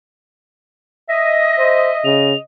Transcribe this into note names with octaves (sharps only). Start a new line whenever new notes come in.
D#5 E5 A#6
C5
C#3 F7